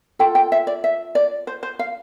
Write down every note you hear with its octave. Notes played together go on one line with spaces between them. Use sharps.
F4 A4 G5
G5
E5
D5
E5
D5
C5
C5
F5